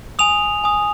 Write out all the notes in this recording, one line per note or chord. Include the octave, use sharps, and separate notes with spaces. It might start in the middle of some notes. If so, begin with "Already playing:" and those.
G#5 D#6 F7
G#5 D#6